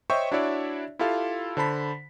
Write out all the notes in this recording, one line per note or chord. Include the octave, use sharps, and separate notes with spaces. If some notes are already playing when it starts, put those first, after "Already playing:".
C5 C#5 D#5 E5 G5 C#6
D4 E4 F#4 C#5 D5 E5
E4 F4 G4 A4 F5
D3 C5 A5 B5 B6